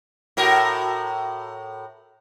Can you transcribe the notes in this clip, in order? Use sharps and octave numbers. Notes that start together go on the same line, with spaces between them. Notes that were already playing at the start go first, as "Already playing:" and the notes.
A2 F#4 A#4